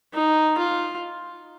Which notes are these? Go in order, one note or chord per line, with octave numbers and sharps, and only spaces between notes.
D#4
F4